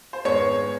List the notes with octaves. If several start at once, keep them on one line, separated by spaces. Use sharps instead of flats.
C5
G#2 D#3 G#3 B3 C#5